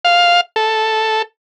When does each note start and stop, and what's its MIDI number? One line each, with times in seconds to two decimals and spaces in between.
0.05 0.41 77
0.56 1.22 69